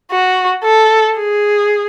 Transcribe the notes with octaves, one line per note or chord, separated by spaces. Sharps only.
F#4
A4
G#4